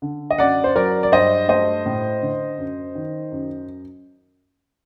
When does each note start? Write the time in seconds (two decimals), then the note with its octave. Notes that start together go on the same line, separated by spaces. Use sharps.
0.02 D3
0.31 D#5
0.38 F#2 D5 F#5
0.64 C5
0.76 F#3 A#4 D5
1.03 D5
1.12 G2 C5 D#5
1.48 A3 C5 D#5
1.86 A2
2.22 D3
2.58 F#2
2.95 D#3
3.32 F#2